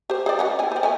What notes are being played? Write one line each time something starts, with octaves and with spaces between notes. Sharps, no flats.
G4 C5
G#4 C5 D5
G#3 C#4 F#5
A#3 E4 G#5
C4 C5
A3 B3 G#5